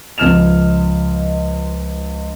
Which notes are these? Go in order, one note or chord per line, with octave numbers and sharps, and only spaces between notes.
C#2 F3 D#5 F6 E7 F7